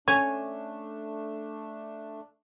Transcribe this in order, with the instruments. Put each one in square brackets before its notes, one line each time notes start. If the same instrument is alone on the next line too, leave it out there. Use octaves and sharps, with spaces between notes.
[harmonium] A3 D4 [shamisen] C#4 [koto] G#5